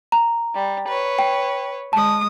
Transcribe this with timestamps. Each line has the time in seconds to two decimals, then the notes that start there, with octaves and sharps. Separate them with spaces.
0.12 A#5
0.54 G3
0.88 B4 C#5
1.19 G5
1.93 G#3 A5 D#6